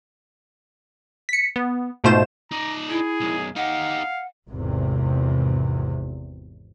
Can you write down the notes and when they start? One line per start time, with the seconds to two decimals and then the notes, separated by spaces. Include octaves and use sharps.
1.29 B6 C#7
1.56 B3
2.04 G#2 B2 A3 F4 C5 E7
2.51 D#4 D5 A#5
2.90 E4 G#4
3.20 B1 F#2
3.56 D#4 G4 F5 F#5
4.48 G#1 E2 C3